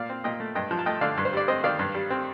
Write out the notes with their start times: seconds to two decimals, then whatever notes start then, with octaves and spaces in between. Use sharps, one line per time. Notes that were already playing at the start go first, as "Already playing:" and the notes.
Already playing: A#2 D5 F5
0.09 C4
0.24 A#2 D#5 G5
0.40 A3
0.55 G2 D#5 G5
0.71 F3
0.79 A5
0.86 A3 D#5 G5
1.01 D3 D5 F5
1.18 G2
1.25 C5
1.33 G3 D5
1.48 C4 C5 D#5
1.64 D#3 D5 F5
1.79 G2
1.95 G3
2.10 C4